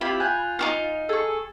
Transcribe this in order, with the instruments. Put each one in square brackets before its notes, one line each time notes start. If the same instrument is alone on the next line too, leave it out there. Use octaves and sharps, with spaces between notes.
[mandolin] C4 E4 G4 [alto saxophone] F4 [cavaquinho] B5
[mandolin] G#5 F#6 G6
[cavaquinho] D#4 F#4 F5
[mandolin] G#4 C#6 [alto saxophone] A4